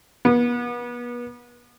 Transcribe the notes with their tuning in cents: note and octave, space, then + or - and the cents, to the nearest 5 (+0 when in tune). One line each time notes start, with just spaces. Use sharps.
B3 -35